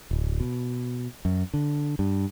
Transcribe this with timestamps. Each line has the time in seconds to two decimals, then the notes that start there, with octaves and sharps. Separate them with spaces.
0.11 D1
0.40 B2
1.25 F#2
1.54 D3
1.99 G2